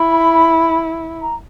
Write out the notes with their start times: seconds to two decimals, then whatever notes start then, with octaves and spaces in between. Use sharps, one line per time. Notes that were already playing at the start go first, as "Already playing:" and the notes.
Already playing: E4 B5
1.22 A#5